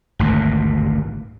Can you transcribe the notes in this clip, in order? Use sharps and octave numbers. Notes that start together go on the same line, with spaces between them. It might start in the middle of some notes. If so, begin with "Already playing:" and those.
G#1 D2 G2 A#2